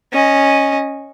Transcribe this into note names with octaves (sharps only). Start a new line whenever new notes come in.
C#4 D#5